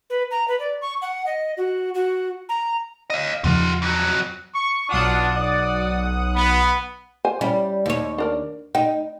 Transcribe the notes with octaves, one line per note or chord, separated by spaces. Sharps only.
B4
A#5
B4
D5
C#6
F#5
D#5
F#4
F#4
A#5
D#5 F5
E2 C#3 F3 F4 F#5
F2 F#3
C#6
B1 D4 F4 F#5 D#6
D5
B3
C5 G#5
G3 C#4 E4
D#2 C#5
D4 A#4 D5
D#4 G5